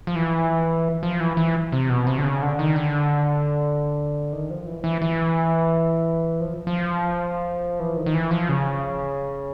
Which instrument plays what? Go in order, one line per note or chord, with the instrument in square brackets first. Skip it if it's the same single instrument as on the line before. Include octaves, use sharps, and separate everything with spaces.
[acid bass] F3
E3
F3
E3
E3
C3
B2
C3
D3
C#3
D3
D#3
D3
D#3
F3
E3
E3
E3
F3
F3
E3
D#3
D#3
E3
F3
C#3